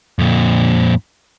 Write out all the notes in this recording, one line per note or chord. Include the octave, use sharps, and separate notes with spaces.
F2 A#2